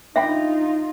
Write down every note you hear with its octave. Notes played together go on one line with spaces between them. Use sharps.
D4 D#4 F4 E5 G5 B5